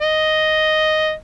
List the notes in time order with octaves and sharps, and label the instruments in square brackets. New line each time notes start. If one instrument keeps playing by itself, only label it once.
[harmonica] D#5